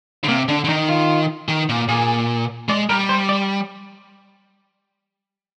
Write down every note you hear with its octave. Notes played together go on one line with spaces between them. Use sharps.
D3
C3 A#3
D3 D4
D3
D#3 D#4
F4
D#3
A#2
A#2 G#4
G#3 D5
G3 A#4
C5
D5